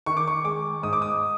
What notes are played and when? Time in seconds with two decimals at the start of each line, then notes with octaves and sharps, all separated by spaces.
0.06 D#3 C#6
0.17 D6
0.28 C#6
0.44 G#3 D6
0.83 G#2 D#6
0.93 D6
1.02 D#6